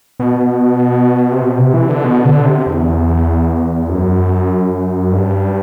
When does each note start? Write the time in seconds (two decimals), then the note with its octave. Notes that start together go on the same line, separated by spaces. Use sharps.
0.20 B2
1.32 C3
1.42 B2
1.58 C3
1.74 E3
1.89 D3
2.04 B2
2.25 D3
2.45 C3
2.66 E2
3.89 F#2
5.12 G2